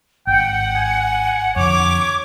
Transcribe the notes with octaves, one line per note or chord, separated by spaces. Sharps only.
G#1 F#5 G5
G#5
F2 D3 C#5 D6